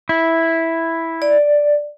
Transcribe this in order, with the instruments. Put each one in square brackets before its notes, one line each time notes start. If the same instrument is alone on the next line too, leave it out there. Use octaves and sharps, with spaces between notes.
[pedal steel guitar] E4
[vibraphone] D5